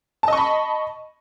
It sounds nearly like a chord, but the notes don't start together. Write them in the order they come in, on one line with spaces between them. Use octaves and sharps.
A5 D#5 C#6 B5